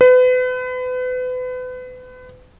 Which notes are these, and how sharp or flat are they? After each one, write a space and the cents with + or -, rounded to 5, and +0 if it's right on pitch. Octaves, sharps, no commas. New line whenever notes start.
B4 +35